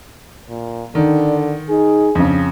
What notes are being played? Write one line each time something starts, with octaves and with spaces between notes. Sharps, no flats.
A#2
D3 D#3 D5
D#4 G#4
F2 C#3 D4